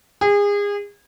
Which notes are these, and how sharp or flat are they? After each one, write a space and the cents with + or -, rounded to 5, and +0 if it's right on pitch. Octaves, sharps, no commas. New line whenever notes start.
G#4 -30